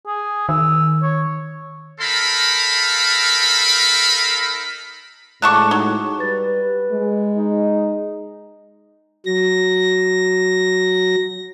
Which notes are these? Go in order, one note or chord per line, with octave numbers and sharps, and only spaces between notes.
G#4
D#3 E6
C#5
D#4 A4 A#4 F5 B5
A2 D3 G#3 A5 C#6 D6 F#6
F#3 D#4 C#6
G3 B4 A6
G#3
D#4
F#3 A#6